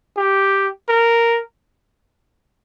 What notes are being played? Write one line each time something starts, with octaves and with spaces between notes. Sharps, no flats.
G4
A#4